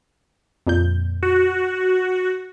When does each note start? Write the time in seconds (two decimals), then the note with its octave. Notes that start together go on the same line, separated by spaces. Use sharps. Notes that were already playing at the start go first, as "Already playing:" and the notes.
0.67 F2 A#2 G6
1.23 F#4